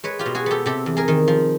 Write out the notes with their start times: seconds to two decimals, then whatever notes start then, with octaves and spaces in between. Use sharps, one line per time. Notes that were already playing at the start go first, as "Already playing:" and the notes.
0.04 G#3 B4 C#5
0.19 F4 G4
0.26 B2
0.35 F#4 G#4
0.46 B3 G4 A4
0.66 C3 G4 A4
0.86 E2
0.97 G#4 A#4
1.08 D#3
1.28 F3